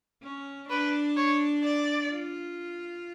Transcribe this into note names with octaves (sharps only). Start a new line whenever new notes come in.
C#4
D4 B4
C#5
D5
F4